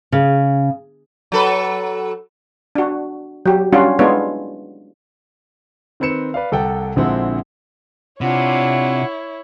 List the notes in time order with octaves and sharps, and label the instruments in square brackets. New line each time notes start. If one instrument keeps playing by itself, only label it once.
[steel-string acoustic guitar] C#3
[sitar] F#3 A4 B4
[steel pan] D4 F#4
F#3 G4
G3 C#4 D4 F4 F#4
G#3 B3 D4 E4 F4 C#5
[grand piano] D#3 C4 B4 C#7 E7
B4 D5 F5
C2 A4 F#5 G5
A#1 D3 G#3 C4 E4 F#5
[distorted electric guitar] C3 [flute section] D4 F4 F#5 [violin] E4 C#5